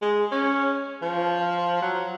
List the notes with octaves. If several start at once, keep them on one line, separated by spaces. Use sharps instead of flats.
G#3
C#4
F3
F#3